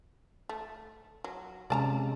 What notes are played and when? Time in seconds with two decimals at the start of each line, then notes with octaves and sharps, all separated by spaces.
0.49 A3
1.24 F#3
1.70 C3 G#3 C#4 D5 A5 A#5